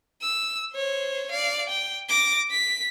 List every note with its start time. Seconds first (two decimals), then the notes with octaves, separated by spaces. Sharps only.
0.22 E6
0.74 C5 C#5
1.32 D5 F5
1.69 G5
2.09 D6 A#6
2.51 B6